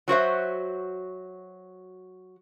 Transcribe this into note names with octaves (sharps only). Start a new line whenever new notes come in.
F#3 F#4 C5 E5